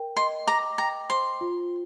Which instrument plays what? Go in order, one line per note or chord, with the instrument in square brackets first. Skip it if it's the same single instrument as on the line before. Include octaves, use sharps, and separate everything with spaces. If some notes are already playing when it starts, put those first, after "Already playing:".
Already playing: [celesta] A#4 G5
[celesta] D#5 [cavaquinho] C6
[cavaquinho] A#5 [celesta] D6
[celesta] G5 [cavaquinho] A#5
[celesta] C5 [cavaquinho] C6
[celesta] F4